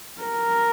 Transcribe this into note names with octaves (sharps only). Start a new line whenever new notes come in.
A#4